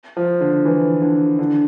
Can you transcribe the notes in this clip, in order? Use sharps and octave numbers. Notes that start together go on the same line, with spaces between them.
F3
D3
E3
D3
D3